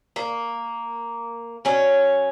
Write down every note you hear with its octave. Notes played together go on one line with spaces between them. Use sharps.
A#3
F#3 C#4